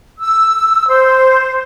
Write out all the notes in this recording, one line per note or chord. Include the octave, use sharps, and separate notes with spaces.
E6
C5